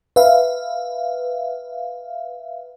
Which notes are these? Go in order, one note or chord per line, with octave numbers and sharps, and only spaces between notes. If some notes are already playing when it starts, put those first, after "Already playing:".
B4 E5 F5